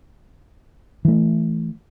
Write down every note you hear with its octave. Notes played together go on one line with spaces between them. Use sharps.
E3 A3